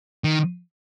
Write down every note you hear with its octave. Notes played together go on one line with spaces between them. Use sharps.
D#3